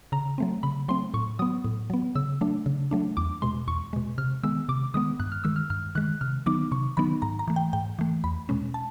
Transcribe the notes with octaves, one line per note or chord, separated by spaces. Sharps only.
C#3 A#5
F#3 A3 C4
C#3 B5
F#3 A3 C4 C6
A2 C#6
F#3 B3 D#6
A2
F#3 B3
C#3 E6
F#3 A3 D4
C#3
F#3 A3 D4
E2 D6
B2 G#3 C6
E2 C#6
B2 G#3
C3 F6
D#3 G#3 B3 E6
C3 D6
D#3 G#3 B3 D#6
G2 F#6
F6
D#3 G#3 E6
F6
G2 F6
D#3 G#3 F#6
C3 F6
D#3 F#3 B3 D#4 D6
C3 C#6
D#3 F#3 B3 D#4 B5
G#2 A#5
A#5
E3 A3
G5
G#2 G5
E3 A3
E2 B5
B2 G#3 C#4
A5